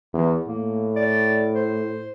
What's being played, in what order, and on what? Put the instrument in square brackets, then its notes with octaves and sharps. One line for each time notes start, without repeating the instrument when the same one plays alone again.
[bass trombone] E2
[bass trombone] A2 [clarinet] A#3
[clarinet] D5
C5